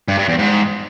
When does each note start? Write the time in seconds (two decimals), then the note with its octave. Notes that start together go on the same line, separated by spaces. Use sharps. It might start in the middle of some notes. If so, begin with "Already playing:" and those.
0.08 G2
0.19 G2
0.29 E2
0.39 G#2